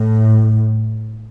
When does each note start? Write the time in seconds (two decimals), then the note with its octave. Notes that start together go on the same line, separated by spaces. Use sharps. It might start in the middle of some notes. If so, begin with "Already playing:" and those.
Already playing: A2